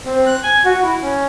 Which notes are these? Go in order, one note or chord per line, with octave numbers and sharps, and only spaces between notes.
C4
F#6
G#5
F#4
E4
C#4